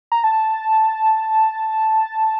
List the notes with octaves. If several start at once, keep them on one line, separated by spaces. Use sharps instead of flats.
A#5
A5